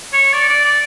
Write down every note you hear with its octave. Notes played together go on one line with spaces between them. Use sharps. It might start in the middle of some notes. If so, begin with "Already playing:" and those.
C#5
D5
D5
D5